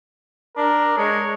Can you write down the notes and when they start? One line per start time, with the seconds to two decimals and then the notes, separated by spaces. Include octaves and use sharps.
0.57 D4 A#4
0.97 G#3 C#5